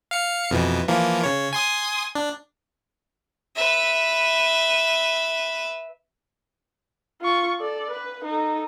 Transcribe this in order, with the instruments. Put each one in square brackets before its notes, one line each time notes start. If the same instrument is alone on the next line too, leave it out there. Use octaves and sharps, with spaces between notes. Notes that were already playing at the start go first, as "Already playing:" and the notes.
[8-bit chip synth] F5 C#7
F2 B2 E3
E3 F3 A#3
C#3 C#5
G#5 C6 D#6
D4
[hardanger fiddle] B4 E5
[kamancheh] F4 C#6
A4 D5
B4
D#4 A4